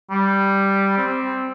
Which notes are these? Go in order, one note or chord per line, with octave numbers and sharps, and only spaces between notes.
G3
C4